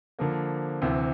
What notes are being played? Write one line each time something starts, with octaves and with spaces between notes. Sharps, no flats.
D3 F3 A#3
D2 C3 E3